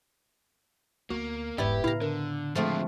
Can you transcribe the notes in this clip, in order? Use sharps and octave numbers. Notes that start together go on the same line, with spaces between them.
D2 A#3 B3 F#4
E1 G#2 B3 E4 G4 D5
A2 C#3 E4 F5 A#5
D3 A#4
D3 F3 G#3 A3 C4